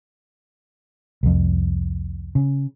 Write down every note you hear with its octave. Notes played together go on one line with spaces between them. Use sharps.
C2 F2
C#3